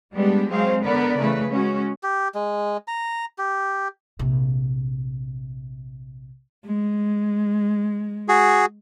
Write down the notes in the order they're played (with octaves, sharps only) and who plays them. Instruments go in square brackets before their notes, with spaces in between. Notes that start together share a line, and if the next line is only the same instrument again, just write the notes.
[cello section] G3 G#3 B3 D4 G4
F#3 G#3 C4 G#4 C5 F5
D3 B3 A#4 B4 D5
C#3 E3 A3 B4
G#3 C#4 F#4
[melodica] G4
G#3
A#5
G4
[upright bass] A#1 C3
[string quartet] G#3
[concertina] F#4 G#4